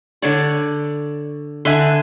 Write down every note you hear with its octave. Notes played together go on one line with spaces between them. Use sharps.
D3 C#5 D5
D3 B4 E5 G#5